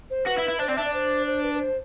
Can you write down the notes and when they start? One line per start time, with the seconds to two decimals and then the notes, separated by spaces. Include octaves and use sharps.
0.10 C5
0.27 F#4 B4
0.38 E4
0.49 E4
0.59 D4 C5
0.68 C4 D5
0.76 D4 E5
0.85 D5
0.94 C5
1.26 C5
1.43 B4
1.55 B4
1.59 C5